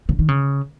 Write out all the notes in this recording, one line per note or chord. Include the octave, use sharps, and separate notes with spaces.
C#3
D#3
C#3